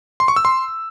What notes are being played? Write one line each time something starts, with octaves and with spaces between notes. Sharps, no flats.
C6
C#6
E6
C6